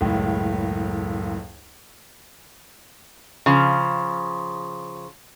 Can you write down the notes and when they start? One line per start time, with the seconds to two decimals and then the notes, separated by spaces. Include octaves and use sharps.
0.01 F#1 C#2 A2
3.46 C#3 F3